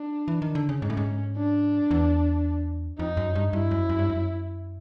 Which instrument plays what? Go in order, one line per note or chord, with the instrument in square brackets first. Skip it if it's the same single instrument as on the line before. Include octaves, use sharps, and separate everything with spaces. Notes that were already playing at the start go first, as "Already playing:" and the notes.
Already playing: [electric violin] D4
[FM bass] E3
D#3
D3
C#3
[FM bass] G#2 [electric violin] C#4
[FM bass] A2
G#2
[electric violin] D4
[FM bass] E2
[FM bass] F2 [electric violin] D#4
[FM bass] F#2
G2
[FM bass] G2 [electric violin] E4
[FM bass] F#2
F#2
G2
F#2